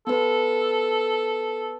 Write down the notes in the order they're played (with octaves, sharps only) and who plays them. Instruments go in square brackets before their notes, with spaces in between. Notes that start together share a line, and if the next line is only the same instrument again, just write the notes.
[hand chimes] B3 B4 [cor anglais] A4